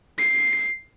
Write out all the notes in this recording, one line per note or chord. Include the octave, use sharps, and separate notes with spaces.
C7